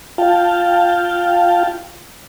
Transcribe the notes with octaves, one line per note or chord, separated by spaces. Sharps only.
F4 F5 G5 A5